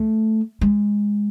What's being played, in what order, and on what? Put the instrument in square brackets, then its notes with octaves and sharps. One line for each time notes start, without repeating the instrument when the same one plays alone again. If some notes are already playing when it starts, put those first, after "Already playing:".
Already playing: [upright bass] A3
G#3